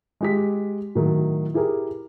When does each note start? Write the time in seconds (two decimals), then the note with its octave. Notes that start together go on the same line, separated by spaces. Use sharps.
0.21 G#3 G4 B6
0.95 A2 D#3 F#3
1.54 E4 G4 G#4 A#4